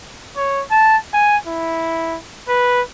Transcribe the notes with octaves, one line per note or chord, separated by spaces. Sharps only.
C#5
A5
G#5
E4
B4